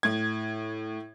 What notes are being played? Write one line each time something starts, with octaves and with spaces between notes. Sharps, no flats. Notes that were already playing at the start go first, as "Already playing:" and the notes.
A2 G#6